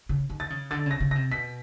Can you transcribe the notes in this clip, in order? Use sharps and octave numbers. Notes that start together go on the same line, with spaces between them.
C#3
D#3
A6
C#3
D3 A6
C#3 A#6
C#3
A#6
C3
B2 B6